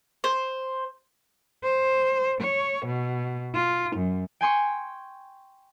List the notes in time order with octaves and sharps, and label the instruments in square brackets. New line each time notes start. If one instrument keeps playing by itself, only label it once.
[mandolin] C5
[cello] C5
C#5
B2
F4
F#2
[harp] G5 G#5 C6 C#6